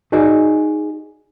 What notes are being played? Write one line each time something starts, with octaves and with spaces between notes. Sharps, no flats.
D#4 F#4 G#4 D5 D#5